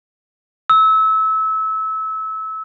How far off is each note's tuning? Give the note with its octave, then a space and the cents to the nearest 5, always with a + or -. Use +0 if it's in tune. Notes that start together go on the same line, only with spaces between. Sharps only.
E6 -25